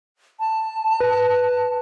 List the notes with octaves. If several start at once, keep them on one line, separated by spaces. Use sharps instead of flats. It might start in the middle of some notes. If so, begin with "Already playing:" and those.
A5
B4